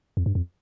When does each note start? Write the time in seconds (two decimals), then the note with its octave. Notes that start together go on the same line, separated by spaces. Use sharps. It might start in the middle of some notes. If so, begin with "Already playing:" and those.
0.17 F2
0.26 G2
0.35 F2